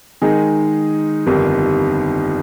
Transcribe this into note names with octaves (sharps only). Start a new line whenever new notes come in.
D#3 G#3 D#4 G#4
G1 F2 D#3 G3